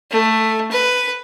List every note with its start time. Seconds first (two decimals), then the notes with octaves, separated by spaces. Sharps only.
0.11 A3
0.71 B4